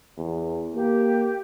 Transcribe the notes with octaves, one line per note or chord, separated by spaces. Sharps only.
E2
A#3 G4